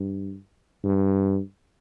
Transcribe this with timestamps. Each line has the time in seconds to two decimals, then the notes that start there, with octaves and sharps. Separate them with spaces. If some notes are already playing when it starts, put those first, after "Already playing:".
Already playing: G2
0.84 G2